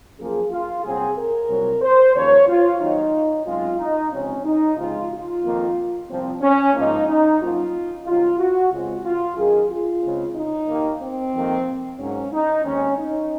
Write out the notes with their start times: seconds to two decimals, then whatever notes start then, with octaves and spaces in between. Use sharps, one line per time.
0.18 F#2 F3 A#3 G#4
0.51 F4
0.83 C2 A#2 F#3 C4 G#4
1.16 A#4
1.49 C2 A#2 F#3 C4
1.81 C5
2.15 D#2 C#3 F3 A#3 C#5
2.47 F4
2.80 D#2 D#3 F#3 D#4
3.45 F#2 C#3 G#3 C4 F4
3.79 D#4
4.11 C#2 C3 F3 C4 C#4
4.45 D#4
4.77 C#2 C3 F3 G#3 C4 F4
5.10 F4
5.42 F2 D#3 A#3
6.08 C2 A#2 F3 C4
6.41 C#4
6.73 G#2 F3 A#3 D#4
7.07 D#4
7.40 F#2 F3 A#3 F4
8.06 C2 C3 D#3 F#3 F4
8.39 F#4
8.71 C#2 C#3 G#3 C4 F4
9.04 F4
9.36 F#2 D#3 A#3 G#4
9.69 F4
10.02 C#2 C#3 G#3 C4
10.35 D#4
10.68 D#2 D#3 A#3
11.01 C4
11.33 F2 C3 D#3 A#3
11.99 G#2 F#3 A#3 C#4
12.32 D#4
12.64 D#2 D#3 G#3 C4 C#4
12.98 D#4